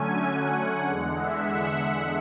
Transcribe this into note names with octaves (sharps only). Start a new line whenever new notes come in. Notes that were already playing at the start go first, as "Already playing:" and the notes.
Already playing: D3 F#3 A3 C#4 G#5
F#5
E2 D3 G#3
E5
F#5